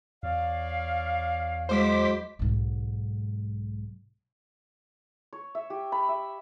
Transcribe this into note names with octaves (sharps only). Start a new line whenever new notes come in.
E2 C#5 D5 F5
F#3 G#3 E4 C5 D6 B6
B1 G#2
C#5
E5
G4
B5
E5